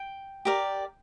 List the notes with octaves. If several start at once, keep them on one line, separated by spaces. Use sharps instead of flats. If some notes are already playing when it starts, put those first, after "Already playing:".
Already playing: G5
G4 A#4 D5